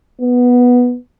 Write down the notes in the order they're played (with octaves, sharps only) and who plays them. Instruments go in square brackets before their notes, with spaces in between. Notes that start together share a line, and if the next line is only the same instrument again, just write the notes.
[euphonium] B3